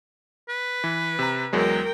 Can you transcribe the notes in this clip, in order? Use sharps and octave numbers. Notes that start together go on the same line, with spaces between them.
B4
E3
C3 A#5
E2 F#3 G#3 A#4 G5